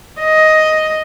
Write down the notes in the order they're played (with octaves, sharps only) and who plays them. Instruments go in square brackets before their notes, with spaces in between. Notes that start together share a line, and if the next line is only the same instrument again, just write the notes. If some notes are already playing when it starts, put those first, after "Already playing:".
[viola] D#5